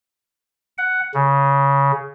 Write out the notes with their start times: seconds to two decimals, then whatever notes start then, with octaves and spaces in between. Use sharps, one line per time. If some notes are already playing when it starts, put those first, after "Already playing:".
0.78 F#5
1.14 C#3